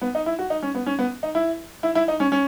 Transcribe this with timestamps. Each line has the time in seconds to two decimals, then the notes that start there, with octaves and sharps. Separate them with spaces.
0.02 B3
0.15 D#4
0.26 E4
0.39 F#4
0.50 D#4
0.62 C#4
0.75 B3
0.86 C#4
0.99 B3
1.23 D#4
1.35 E4
1.83 E4
1.95 E4
2.08 D#4
2.20 C#4
2.32 C#4